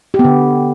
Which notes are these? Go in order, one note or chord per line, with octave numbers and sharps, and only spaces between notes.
G4
B3
D3